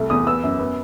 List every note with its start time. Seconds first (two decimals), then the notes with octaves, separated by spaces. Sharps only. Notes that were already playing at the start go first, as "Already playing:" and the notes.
Already playing: C2 A3
0.10 E2 D#6
0.26 B3 E6
0.43 F#2
0.59 B3